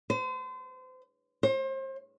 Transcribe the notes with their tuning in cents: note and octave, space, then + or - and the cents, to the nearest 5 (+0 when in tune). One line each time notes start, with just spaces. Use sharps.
C5 -35
C5 +35